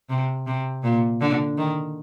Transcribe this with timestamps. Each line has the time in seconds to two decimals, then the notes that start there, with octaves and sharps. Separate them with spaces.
0.09 C3
0.47 C3
0.84 A#2
1.21 D3
1.58 D#3